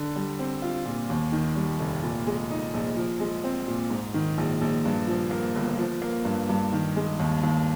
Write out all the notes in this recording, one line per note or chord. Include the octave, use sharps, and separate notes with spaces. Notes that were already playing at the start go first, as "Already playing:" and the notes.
Already playing: D3
G3
C4
F4
A#2
D#2
D#3
G3
F1
A#2
G#3
D#4
A#1
F3
G#3
C4
A#2
G#2
D#3
A#1
A#1
G2
F3
A#3
G1
F3
A#3
G2
G2
D#3
G#3
D#2
D#2